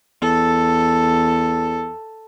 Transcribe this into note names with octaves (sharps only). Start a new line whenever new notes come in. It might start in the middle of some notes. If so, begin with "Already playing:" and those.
E2 A4